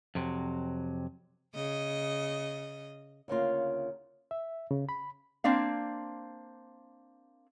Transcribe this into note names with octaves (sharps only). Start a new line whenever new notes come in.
F2 C3 F#3
C#3 D#5
D2 C#3 A#3 F4
E5
C#3
B5
A#3 C4 D4 F5